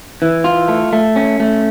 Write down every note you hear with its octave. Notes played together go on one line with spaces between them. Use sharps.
E3
F4
A3
A3
C#4
A3